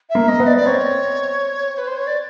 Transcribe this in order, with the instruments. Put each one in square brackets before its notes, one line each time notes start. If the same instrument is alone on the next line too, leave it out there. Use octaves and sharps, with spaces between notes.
[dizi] E5
[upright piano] A#3
[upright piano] A#3 [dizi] D#5
[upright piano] B3
[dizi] D5
D5
[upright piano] C4 [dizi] C#5
[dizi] B4
C5
C#5
D5